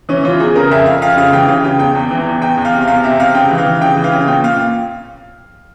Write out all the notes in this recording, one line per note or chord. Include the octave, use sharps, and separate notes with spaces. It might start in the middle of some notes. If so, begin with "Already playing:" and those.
E3 C#4
E3 F4
E2 G#4
C#3 A#4
F2 E5
F2 F5
F2 F5
C#3 F5
E3 G5
C#3 F5
C#3 G5
E2 G5
E2
E3
E2
E2 G5
E2
F5
C3
E2 F5
C3 E5
C3 F5
C#3 G5
E3
F5
E3
C#3 G5
E3
F5
C#3
A#2 G5
A#2 F5